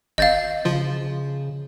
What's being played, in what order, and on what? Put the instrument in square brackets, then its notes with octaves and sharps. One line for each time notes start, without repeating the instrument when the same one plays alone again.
[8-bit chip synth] G#1 G6 A6 [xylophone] D#5 F5
[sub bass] C#3 [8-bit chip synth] F3 F4